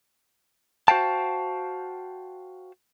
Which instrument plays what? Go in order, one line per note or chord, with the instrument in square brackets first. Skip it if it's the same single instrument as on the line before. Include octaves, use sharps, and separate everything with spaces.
[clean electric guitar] F#4 C5 F5 G5 A5